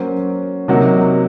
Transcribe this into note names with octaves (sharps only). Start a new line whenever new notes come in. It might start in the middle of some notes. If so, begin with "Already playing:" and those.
Already playing: F#3 A#3 C#4 F#4 C5
C3 F#3 A#3 D#4 F#4